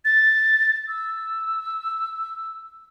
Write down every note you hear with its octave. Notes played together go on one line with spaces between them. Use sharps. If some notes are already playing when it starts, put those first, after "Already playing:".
A6
E6